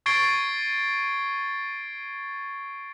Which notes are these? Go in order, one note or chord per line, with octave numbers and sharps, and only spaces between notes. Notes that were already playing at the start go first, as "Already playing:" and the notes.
C#6 G#6 A6 C7 D7 G7